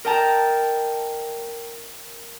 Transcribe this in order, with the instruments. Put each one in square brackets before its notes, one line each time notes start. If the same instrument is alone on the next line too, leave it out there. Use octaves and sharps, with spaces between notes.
[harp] A#4 D#5 G5 A5 A#5